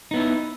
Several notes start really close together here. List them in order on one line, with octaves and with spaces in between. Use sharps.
D#4 B3 E4